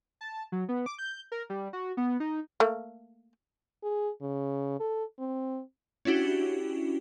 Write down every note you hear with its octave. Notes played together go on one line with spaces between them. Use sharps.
A5
F#3
B3
D6
G6
A#4
G3
F#4
B3
D#4
A3 A#3
G#4
C#3
A4
C4
C#4 D4 E4 F#4 G4